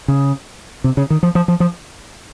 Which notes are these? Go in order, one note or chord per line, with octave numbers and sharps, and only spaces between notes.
C#3
C3
C#3
D#3
F3
F3
F3
F3